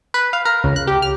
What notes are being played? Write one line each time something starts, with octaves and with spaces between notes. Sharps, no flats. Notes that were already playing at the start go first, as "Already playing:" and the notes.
B4
F5
A#4
C#2
F#6
G4
F6